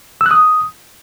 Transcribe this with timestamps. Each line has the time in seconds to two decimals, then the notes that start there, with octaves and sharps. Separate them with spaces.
0.21 E6
0.26 F#6
0.31 D#6